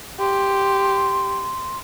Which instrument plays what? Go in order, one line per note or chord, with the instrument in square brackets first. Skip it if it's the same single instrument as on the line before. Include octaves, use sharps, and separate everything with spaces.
[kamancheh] G4 [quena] C6